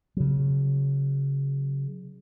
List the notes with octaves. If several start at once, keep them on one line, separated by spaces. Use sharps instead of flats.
C#3 F#3